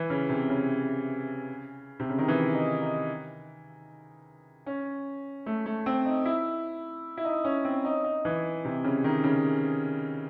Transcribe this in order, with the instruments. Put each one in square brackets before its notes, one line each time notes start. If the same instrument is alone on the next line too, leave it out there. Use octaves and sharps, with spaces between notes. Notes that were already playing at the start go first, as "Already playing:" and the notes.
Already playing: [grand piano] E3
C#3
C3
C#3
C3
C#3
D#3
E3
D#4
D#4
C#4
A3
A3
C4
D#4
E4
E4
D#4
C#4
C4
D#4
D#4
E3
C3
C#3
D#3
C#3